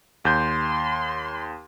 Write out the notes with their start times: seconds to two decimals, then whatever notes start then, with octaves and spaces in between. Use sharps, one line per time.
0.25 D#2 C6 G6